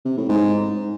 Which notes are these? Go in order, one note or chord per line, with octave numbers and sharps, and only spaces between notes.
C3
A2
G#2